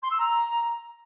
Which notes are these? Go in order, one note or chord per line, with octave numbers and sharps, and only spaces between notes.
C6
E6
A#5